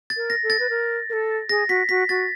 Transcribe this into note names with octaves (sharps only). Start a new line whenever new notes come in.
A6
A#4
A#6
A4
A6
B4
A#4
A#4
A4
G#4 A#6
F#4 B6
F#4 B6
F#4 A6